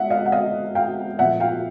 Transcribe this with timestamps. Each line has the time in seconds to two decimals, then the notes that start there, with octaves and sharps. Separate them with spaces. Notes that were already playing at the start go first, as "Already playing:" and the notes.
Already playing: G#3 E5 F#5
0.10 D#5 F5
0.26 F#5
0.32 D#5 F5
0.75 F5 G5
1.18 A#2 F3 A3 E5 F#5
1.40 F5 G5